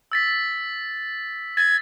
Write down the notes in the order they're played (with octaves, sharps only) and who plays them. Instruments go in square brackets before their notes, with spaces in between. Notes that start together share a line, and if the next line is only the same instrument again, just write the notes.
[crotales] E6 A6 B6
[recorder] G#6 [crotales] A6